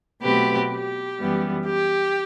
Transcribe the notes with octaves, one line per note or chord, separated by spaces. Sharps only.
B2 F#3 A3 C4 G4 B4
G4
F#2 E3 G3 B3
G4